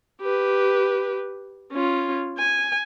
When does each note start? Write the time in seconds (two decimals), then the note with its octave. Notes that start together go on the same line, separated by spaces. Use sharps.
0.22 G4 B4
1.72 C#4 F4
2.38 G#5